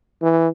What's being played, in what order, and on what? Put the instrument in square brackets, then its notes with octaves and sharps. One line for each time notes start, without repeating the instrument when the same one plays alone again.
[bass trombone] E3